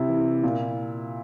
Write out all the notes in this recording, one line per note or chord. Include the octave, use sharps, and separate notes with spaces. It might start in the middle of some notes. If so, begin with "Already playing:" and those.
Already playing: C3 E4
E3
A#2